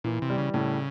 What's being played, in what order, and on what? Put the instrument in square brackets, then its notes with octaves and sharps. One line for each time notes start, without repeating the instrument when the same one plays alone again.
[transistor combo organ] A#2 [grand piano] E3
[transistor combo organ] C3
[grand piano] G3
[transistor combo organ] C#3
[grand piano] A2 [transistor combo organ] C#3